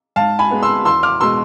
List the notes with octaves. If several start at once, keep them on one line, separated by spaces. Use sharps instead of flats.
G#2 F5 A5
G#5 B5
G#3 B3
C6 E6
E2 C6 E6
D6 F6
B2 G#3 C6 E6